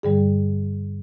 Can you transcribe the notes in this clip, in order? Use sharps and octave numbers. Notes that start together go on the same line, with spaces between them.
G2 D3 G3 G#4